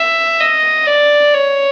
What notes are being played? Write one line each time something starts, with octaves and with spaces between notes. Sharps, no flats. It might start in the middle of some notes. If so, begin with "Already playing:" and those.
Already playing: E5
D#5
D5
C#5